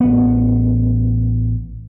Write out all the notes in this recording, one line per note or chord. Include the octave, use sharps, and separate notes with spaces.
A1 B3